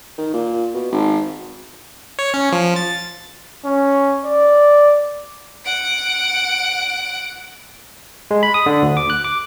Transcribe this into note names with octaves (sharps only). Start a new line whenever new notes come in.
D#3
A#2
B2
G#1
C#5
C#4
F3
A6
C#4
D5
F#5 D7
G#3
B5
D#6
D3
D2
D6
F#6
D6